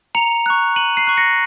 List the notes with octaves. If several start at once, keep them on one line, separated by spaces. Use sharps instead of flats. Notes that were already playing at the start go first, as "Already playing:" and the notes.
A#5 C#7 F7
C#6 F#6
A#5 D#7 F#7
C7 D#7
C#6 F#6
A#6 C#7